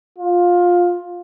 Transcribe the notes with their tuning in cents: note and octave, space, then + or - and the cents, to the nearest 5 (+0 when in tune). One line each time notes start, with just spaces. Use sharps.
F4 +15